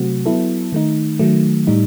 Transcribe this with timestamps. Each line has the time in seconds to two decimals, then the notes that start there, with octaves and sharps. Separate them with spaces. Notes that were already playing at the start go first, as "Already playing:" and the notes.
Already playing: C3 F#3 A3 C4 F#4
0.26 F#3 B3 E4 A4
0.72 D#3 A3 D#4
1.19 D#3 F#3 A3
1.67 A2 G3 D#4